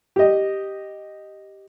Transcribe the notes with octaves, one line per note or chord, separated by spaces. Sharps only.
G4 D#5